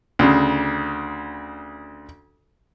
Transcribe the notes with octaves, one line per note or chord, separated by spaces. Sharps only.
D2 C#3